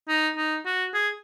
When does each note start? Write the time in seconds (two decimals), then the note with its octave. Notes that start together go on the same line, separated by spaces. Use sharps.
0.08 D#4
0.36 D#4
0.65 F#4
0.94 G#4